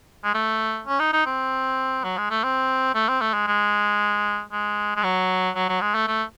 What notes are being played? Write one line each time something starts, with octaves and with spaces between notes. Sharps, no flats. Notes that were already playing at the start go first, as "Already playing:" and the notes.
G#3
A3
C#4
D#4
D#4
C4
F#3
G#3
A3
C4
A3
C4
A3
G#3
G#3
G#3
G#3
F#3
F#3
F#3
G#3
A3
A3